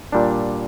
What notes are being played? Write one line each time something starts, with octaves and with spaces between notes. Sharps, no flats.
A#2 G3 D4